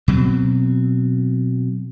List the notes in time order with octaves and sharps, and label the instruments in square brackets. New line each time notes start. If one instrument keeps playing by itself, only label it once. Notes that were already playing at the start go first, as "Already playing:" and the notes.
[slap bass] B2 F#3 C4